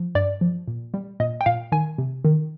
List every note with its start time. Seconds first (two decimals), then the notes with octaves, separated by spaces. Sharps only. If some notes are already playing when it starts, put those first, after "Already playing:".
Already playing: F3
0.15 G2 D5
0.41 F3
0.68 A#2
0.94 G3
1.20 A#2 D#5
1.41 G5
1.46 A#2 F5
1.72 D#3 G#5
1.98 C3
2.25 D#3